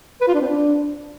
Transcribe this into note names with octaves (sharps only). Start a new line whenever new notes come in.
B4
F4
D4
C4
D4